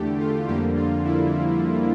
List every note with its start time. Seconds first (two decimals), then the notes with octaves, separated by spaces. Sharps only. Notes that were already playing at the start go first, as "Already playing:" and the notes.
Already playing: E2 D3 A3 G4
0.20 F4
0.48 F2 D3 G3 A#3 G4
0.76 F4
1.05 E4